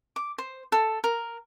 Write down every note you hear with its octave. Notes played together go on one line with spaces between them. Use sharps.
D6
C5
A4
A#4